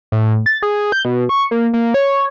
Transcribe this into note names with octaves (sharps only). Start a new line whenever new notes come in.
A2
A6
G#4
G6
B2
C#6
A#3
A#3
C#5